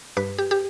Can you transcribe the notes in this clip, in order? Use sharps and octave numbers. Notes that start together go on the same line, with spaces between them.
G2 B4
G4
G4